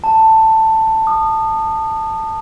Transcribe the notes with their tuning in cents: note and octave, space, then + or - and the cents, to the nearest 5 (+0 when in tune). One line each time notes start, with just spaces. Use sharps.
A5 +10
D#6 -30